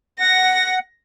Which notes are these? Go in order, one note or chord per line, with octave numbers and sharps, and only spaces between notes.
F#5 A#6